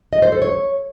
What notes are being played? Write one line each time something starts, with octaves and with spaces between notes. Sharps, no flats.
D#5
C5
A4
C#5